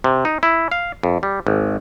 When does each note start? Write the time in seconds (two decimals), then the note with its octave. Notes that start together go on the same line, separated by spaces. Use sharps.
0.04 C3
0.25 D#4
0.43 E4
0.71 F5
1.03 F2
1.23 G3
1.47 G#1